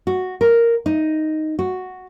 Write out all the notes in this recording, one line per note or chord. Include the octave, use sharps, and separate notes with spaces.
F#4
A#4
D#4
F#4